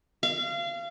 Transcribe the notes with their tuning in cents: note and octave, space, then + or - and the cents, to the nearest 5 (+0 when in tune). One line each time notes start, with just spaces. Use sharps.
F5 -30